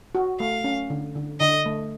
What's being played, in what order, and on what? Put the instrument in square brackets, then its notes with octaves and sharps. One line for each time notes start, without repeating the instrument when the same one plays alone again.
[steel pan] F#4
[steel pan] A3 [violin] F5
[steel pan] C#4
D3
D3
[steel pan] D3 [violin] D#5
[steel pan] A3